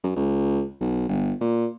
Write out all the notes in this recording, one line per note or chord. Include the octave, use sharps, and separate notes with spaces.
F#2
C#2
B1
G1
A#2